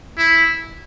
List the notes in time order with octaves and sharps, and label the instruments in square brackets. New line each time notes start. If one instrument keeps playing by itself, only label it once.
[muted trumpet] E4